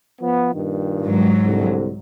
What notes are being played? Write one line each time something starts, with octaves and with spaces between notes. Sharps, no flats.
F3 B3
G2 A#2 D#3
G#2 F#3
C2 D3